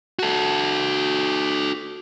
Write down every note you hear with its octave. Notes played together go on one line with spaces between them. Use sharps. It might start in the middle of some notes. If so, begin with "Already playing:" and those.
F#4 A4